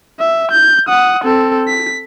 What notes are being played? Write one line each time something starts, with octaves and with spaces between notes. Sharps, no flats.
E5
G6
F#5 D#6
C4 A4
B6